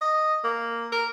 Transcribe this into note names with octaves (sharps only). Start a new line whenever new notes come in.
D#5
A#3
A#4